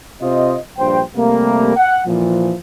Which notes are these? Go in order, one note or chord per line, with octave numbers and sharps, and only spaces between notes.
C3 F4 C5 D#5
A#1 G2 C5 G5
C3 G3 A3 A#3
F#5
A#2 E3 F3